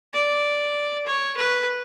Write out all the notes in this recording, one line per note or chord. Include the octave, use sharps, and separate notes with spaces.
D5
C#5
B4